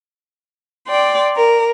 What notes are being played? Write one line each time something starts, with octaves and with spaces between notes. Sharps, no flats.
D5 G5 C6
A#4